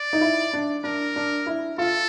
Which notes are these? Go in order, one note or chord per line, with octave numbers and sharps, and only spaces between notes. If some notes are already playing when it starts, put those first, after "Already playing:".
Already playing: D5
D#4
E4
D4
D4 A#4
D4
E4
F4 A4